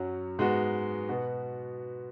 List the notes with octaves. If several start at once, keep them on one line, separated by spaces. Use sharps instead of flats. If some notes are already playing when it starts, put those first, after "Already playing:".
Already playing: F#2 F#3 C#4 F#4
G#2 G#3 B3 F#4
B2 B3 F#4